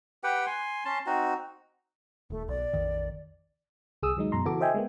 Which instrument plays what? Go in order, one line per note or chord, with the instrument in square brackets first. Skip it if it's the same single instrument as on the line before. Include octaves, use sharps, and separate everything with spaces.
[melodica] G4 B4 F#5 G5
G#5 C6
C#4 A5 C6
C4 D#4 F#4
[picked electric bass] D#1 [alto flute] A3
[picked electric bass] B1 [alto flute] D5
[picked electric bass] A#1 F2 D#3
[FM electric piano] C2 G#4 D#6 E6
D#2 F#3 G#3 D#4
F#2 B2 A#5 C6
C#3 E3 F#4 A4 D6
C5 D#5 E5 G5 G#5
G#3 A#3 B3